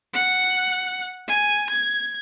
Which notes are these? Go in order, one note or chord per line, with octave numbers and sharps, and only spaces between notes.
F#5
G#5
G#6